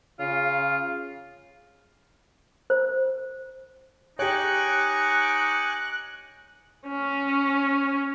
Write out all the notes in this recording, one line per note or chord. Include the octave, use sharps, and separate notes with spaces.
C#3 F4
C5
D#4 G4 C#5 G#5 C#6 D6 F#6
C#4